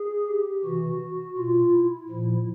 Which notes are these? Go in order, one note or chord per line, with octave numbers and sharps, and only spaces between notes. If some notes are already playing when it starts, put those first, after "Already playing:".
Already playing: G#4
G4
C3 E3 F#4
B2 F4
E4
A#2 F3